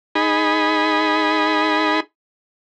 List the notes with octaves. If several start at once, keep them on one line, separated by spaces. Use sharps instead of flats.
D#4 G#4 B5